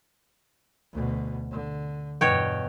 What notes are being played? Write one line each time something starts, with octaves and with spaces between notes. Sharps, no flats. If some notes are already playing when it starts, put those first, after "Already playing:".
D2 B2
D3
E2 G2 B2 C#5 G5